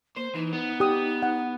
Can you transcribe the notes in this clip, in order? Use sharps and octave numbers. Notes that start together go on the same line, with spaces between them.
A#3 C5
E3 D#4
B3
G4 D#6
F#5